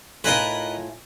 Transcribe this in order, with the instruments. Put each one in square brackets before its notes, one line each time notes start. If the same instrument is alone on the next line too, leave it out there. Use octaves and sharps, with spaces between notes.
[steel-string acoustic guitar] A2 F4 G#5 [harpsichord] D#4 A#4 B4